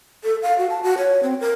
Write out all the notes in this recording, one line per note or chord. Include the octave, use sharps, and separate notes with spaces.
A4
F5
F#4
A5
F#4
C#5
C4
A#4